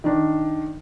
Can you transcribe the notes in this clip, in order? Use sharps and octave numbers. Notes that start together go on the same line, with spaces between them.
D#3 D4